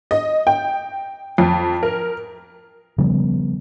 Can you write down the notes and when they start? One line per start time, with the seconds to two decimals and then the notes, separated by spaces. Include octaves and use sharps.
0.11 D#5
0.47 G5
1.38 F2
1.83 A#4
2.98 C#3 F3 G3 B3